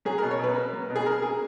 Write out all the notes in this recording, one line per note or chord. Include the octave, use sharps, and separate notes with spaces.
F#3 G#4
B2 A#4
C#5
B2 B4
A#3
F#3
B2
G#4
B2 A#4
A#3 G#4